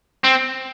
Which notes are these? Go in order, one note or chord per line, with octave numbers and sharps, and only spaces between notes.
C4